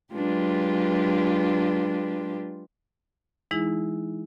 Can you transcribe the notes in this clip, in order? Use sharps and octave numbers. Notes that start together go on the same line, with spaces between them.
F#3 G#3 D4 F4 G4 B4
E3 G#3 D#4 E4 G#4